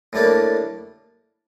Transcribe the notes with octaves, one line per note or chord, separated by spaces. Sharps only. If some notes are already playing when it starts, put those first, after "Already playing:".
A2 G3 A#3 D4